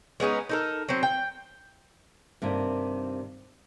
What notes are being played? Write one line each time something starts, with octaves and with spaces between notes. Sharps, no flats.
G#3 B3 C#4 D#4
D#4 A4 A#4
F#3 C4
G5
G2 C3 D#3 A#3